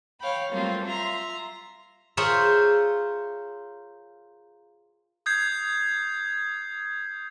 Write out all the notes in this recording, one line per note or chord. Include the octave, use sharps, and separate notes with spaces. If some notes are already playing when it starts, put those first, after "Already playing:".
C#5 F5 G5 B5
F#3 G3 A3 A#3 C4 F4
F4 E5 A#5 C6
F4 G#4 A#4 C5 C#5 E5
D#6 G6 G#6 C7